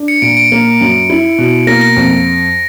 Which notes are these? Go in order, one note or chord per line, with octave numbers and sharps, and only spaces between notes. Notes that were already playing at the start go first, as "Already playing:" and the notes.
Already playing: D4
C#7
A#2 D7
D7
A#3
F#2
E4
B2
A#3 A#6
A#6
F2